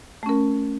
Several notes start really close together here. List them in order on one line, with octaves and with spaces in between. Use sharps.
A3 C#4 A#4